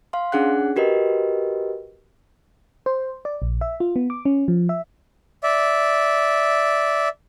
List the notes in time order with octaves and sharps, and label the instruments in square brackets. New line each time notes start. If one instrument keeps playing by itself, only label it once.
[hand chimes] F5 C6
C#4 D4 G#4 F#5 F#6
F#4 G4 A#4 B4 D#5
[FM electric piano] C5
D5
A#1
E5
F4
B3
D6
C#4
F3
E5
[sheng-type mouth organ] D5 E5